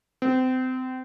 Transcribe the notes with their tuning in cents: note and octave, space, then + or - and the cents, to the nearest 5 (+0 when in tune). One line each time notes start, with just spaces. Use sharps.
C4 -30